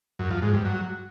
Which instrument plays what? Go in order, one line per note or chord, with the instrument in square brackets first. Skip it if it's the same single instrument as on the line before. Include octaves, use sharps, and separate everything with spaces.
[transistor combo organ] F#2
F3
G#2
G2
F#3